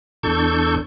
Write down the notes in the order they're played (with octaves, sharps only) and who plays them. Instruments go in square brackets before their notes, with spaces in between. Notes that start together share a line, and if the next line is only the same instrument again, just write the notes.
[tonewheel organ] E2 D4 A4 C#6 G6